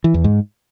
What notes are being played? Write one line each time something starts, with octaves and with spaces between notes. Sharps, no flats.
E3
E2
G#2